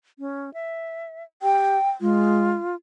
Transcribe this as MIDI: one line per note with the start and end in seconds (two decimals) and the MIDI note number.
0.19 0.53 61
0.54 1.23 76
1.42 1.78 67
1.42 1.90 79
2.01 2.49 56
2.01 2.75 65